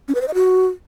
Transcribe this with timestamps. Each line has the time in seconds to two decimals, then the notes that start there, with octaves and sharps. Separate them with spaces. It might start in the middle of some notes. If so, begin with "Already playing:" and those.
0.08 C#4
0.15 B4
0.21 C5
0.28 D#5
0.34 F#4